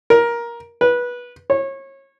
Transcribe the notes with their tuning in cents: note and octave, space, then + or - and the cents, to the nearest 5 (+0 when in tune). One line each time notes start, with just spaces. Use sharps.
A#4 +15
B4 -20
C#5 -30